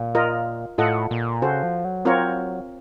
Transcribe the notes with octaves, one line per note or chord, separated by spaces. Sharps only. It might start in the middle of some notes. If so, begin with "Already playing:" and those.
Already playing: A#2
F4 A#4 D#5
A2 F4 A4 D#5 F#5
A#2
C#3 F#4 A4 C5
F3
F#3
C4 F4 A#4 C#5